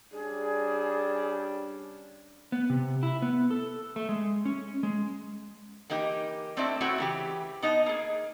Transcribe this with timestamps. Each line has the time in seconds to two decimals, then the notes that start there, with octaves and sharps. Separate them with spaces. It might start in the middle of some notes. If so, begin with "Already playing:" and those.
0.12 G3 C#4 D4 G#4
2.52 B3
2.70 C3
3.03 E4
3.22 B3
3.51 A4
3.96 A3
4.09 G#3
4.45 C#4
4.83 G#3
5.90 E3 A#3 D#4 G4
6.57 A3 C4 D4 E4 D5 E5
6.81 A3 C4 E4 F#4 C#5
6.98 C#3 E3 G4
7.62 B3 D#4 D#5 A5
7.86 A#3 G#4